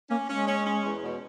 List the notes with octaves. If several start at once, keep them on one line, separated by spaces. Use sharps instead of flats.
A#3 C#4
G#3 C#4
C#4
C#4
E2
B2